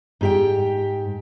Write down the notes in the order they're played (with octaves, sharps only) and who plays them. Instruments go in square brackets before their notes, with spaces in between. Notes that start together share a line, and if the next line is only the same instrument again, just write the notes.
[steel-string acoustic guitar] G#2 G4 G5